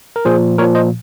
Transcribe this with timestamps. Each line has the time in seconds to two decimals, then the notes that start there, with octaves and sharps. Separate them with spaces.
0.16 A#4
0.25 A#2 F3 G#4 C5
0.58 A#2 F3 A#4 C#5
0.75 C5 D#5